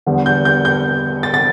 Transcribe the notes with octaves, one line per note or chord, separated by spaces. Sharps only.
E2 D3 G3 B3
G6
G6
G6
A6
A6